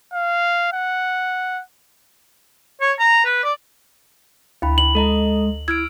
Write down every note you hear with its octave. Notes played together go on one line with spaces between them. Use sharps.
F5
F#5
C#5
A#5
B4
D5
D2 E4 G5 B5
F#7
G#3 A4 D#5 A#5
E4 E6 F6 G#6 D7